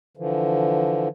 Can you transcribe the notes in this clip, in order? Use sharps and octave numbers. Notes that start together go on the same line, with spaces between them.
D3 E3 F3